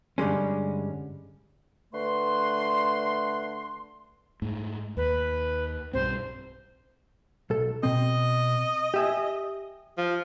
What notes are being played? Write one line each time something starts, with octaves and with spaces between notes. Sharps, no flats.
G2 D3 G3 G#3 C#4
D3 A3 B4 C6
G#2 A3
D#2 B4
B1 G2 C4 C5
B1 A4
B2 C4 D#5
G4 E5 G#5
F3